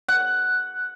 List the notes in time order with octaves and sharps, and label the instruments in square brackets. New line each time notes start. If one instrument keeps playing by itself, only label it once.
[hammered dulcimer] F#5